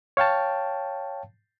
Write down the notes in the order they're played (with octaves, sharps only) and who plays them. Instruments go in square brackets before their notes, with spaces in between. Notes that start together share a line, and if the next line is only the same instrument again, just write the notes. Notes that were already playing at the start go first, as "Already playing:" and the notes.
[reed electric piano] C#5 F5 G5 A5